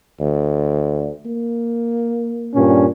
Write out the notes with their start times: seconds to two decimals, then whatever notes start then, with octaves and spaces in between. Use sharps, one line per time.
0.20 D2
1.25 A#3
2.55 G2 A#2 C#4